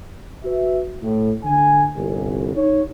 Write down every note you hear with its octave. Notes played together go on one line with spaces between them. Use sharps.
F#4 B4 E5
A2
D3 G#5
G1 C2
D#4 C#5